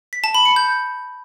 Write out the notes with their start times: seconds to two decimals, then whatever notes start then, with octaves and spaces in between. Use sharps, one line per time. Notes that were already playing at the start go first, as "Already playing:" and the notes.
0.13 B6
0.24 A5
0.35 B5
0.45 C#7
0.56 G6